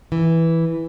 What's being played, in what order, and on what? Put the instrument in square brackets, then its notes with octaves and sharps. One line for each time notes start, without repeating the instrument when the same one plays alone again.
[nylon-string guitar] E3